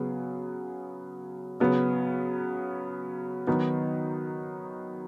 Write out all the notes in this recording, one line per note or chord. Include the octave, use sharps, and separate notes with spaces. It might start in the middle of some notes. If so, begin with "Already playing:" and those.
Already playing: C#3 F#3 B3 G#4
C#3 F#3 B3
D#3 F#3 B3 D#4